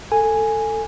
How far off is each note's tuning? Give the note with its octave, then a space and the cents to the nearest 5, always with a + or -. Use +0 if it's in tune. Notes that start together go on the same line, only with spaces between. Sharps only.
A4 +15 G#5 +0